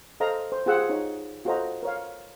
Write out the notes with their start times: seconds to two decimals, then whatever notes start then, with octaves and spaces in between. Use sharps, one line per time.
0.20 A4 C5 D#5 F5 A#5
0.52 C5
0.66 F4 G4 G#4 C5 F#5 E6
0.89 D#4 C#5
1.45 F4 F#4 A4 C5 D#5 A#5
1.83 A#4 C#5 F5